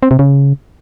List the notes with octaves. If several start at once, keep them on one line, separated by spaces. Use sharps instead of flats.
C4
C3
C#3